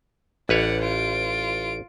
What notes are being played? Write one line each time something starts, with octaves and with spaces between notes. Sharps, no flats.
A1 B4 C#5 D5 F#5
F4 D7